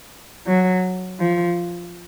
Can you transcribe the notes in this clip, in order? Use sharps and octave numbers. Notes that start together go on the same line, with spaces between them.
F#3
F3